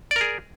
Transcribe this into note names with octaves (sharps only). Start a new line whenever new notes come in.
G#4 A#4 D5